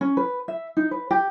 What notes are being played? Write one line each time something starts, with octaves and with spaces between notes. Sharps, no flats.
C#4
B4
E5
D#4
B4
G4